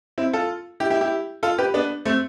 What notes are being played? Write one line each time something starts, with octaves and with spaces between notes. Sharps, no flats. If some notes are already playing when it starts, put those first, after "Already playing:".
C4 E4
F4 A4
E4 G4
E4 G4
E4 G4
F4 A4
G4 B4
B3 D4
A3 C4